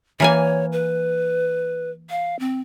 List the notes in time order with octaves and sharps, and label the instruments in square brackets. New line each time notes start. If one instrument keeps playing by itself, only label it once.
[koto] E3 A#3 G#5 [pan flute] C#5
[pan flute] B4
F5
C4